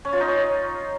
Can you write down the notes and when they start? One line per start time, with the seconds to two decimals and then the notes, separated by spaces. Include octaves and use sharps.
0.05 C#4
0.13 F4
0.20 D#4
0.28 C#4